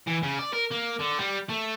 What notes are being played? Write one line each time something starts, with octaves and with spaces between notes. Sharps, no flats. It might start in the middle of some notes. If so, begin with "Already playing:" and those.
E3
C#3
D5
A#4
A#3
D3
G3
A3